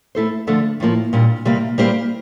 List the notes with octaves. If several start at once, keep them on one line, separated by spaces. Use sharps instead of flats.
A3 E4 A4 C5
D3 F3 A3 D4 A4
A2 F3 A#3
A#2 G3 D4
C3 G3 A#3
G3 A#3 E4 G4 C5